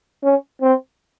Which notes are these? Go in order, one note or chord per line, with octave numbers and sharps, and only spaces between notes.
C#4
C4